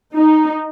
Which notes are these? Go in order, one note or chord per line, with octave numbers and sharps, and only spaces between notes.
D#4